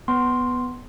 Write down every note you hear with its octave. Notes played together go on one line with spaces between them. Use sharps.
B3 C6